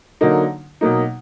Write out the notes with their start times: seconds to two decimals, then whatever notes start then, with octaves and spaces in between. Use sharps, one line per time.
0.21 D3 F#3 A#3 D#4
0.81 B2 F#3 A#3 D#4